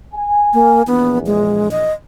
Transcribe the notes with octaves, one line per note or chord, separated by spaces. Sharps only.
G#5
A#3
A#1 E2 B3
G#3
D#5